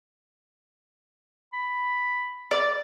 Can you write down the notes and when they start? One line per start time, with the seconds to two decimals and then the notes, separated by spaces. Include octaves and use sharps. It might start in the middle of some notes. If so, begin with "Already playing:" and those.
1.53 B5
2.51 D5